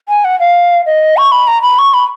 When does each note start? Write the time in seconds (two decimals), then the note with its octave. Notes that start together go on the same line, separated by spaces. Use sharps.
0.09 G#5
0.24 F#5
0.40 F5
0.86 D#5
1.17 C#6
1.32 B5
1.47 A#5
1.62 B5
1.79 C#6
1.94 B5